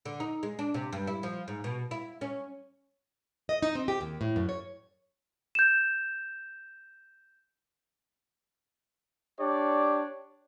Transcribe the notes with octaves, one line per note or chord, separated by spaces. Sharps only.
D3
D#4
G#3
D4
C3
G2
E4
F3
G#2
B2
E4
C#4
D#5
D#4
C4
G4
D#2
A2
F#2
C#5
G6 E7
D4 G4 C#5 D5